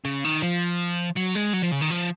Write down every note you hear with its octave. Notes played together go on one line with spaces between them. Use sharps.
C#3
D#3
F3
F#3
G#3
F#3
F3
C#3
D#3
F3